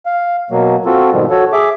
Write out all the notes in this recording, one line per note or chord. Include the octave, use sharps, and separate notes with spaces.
F5
B2 F#3 A#3
C4 F4 F#4 A4
G#2 B2 D#3 F3 G3
F#4 A4 C#5
G#4 E5 D6